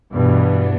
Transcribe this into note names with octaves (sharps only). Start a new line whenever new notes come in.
G2 B2 E3 B3 D4